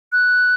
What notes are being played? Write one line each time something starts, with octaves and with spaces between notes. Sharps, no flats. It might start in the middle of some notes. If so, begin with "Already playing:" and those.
F#6